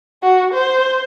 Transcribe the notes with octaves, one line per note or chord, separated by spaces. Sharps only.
F#4
C5